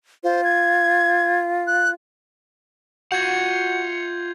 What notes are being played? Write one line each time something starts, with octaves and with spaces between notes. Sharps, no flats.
F4 C5
G#6
F#6
F4 F#4 F#5 G6 G#6 C#7